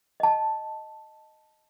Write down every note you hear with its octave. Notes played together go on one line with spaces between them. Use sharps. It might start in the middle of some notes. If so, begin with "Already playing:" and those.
D#5 A5